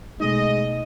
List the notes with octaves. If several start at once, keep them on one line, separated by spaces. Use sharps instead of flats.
B2 G#3 A3 D#4 D#5